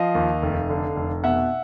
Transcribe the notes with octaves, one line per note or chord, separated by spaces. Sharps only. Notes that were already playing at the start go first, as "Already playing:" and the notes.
Already playing: F3 D#5 F5
D#2
F1
D3
F1
B2 E5 F#5